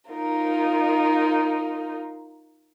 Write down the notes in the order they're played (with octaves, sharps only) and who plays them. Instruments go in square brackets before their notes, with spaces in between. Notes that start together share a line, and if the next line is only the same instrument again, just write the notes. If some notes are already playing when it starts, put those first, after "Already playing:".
[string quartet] D#4 F4 A#4